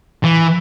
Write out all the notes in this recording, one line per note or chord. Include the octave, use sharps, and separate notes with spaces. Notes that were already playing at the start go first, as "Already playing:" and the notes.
E3